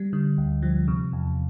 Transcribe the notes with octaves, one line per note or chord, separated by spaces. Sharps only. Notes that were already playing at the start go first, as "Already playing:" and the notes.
Already playing: G3
D3
D2
F3
C3
E2